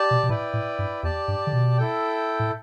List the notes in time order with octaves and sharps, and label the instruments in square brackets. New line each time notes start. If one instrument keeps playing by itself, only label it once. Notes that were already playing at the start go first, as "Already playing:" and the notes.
Already playing: [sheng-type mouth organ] G4 D5 A5
[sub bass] B2
B2
[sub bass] A2 [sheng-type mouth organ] E4 B4 D5 G5
[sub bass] A2
G2
[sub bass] E2 [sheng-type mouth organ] G4 D5 A5
[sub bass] G2
D3
B2
[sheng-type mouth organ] E4 A4 G5
[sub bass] A2